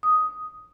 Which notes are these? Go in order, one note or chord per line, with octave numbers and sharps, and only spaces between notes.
D#6